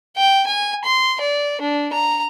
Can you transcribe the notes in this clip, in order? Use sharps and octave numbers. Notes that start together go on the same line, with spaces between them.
G5
G#5
C6
D5
D4
A#5